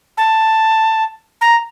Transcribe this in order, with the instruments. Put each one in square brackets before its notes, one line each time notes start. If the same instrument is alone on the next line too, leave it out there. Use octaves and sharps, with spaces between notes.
[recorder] A5
A#5